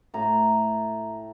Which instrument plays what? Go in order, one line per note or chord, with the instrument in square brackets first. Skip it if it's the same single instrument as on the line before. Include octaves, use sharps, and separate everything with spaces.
[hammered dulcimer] A2 A#5